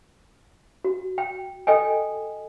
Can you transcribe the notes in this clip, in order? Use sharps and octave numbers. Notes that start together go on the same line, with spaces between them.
F#4
G5
A4 D#5 G5 G#5